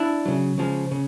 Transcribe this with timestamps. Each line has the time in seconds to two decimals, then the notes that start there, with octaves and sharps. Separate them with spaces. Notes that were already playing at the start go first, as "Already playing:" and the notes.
Already playing: D4 E4
0.26 C#3 F#3
0.58 C#3 F3 G#3
0.91 C#3